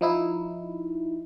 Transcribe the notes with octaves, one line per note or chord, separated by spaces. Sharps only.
F3 D#4 E4